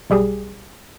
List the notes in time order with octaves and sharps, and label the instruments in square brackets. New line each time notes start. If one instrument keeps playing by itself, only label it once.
[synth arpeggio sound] B1 G3 G4 G#4